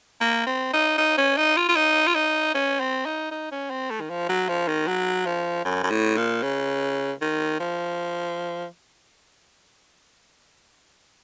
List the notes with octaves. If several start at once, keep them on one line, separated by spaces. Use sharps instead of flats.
A#3
C4
D#4
D#4
C#4
D#4
F4
F4
D#4
F4
D#4
C#4
C4
D#4
D#4
C#4
C4
A3
D#3
F3
F#3
F3
D#3
F#3
F3
F#2
F#2
A2
A#2
C#3
D#3
F3